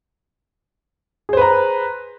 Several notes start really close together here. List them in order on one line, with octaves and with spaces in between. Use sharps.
G#4 C5 B4 A#5